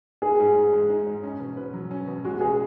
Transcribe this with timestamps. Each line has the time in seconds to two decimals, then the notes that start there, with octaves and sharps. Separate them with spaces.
0.22 D#4 G#4
0.39 G#2
0.56 G#2
0.73 G#3
0.90 D#4
1.06 G#2
1.23 C#4
1.40 B2
1.57 B4
1.74 F#3
1.91 C#4
2.07 B2
2.24 G#3 F#4
2.41 C#2 G#4